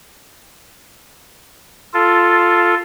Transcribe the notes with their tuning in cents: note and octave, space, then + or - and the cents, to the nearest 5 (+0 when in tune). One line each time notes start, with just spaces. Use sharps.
F4 +0 A4 +0